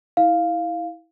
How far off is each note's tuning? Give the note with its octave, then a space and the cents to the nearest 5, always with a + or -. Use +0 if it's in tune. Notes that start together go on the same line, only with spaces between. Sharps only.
E4 -25 F5 +0